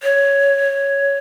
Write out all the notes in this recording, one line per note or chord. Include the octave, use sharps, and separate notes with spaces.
C#5